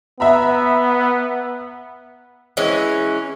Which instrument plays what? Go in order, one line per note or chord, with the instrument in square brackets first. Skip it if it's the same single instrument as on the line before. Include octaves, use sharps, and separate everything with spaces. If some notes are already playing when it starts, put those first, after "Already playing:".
[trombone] B3 [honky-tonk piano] E5 A#5 B5
[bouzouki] E3 G#3 C#4